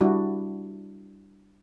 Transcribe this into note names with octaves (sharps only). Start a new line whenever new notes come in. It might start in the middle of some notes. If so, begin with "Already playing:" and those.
G3 D4 E4 F#4